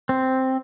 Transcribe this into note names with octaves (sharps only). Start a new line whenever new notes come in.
C4